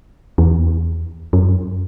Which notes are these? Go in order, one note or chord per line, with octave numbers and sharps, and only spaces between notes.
E2
F#2